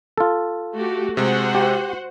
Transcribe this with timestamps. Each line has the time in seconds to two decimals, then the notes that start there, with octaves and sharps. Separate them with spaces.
0.18 F4 A4
0.74 A3 F#4 G4
1.17 C3 G#3 F#4 C5 F#5
1.55 G4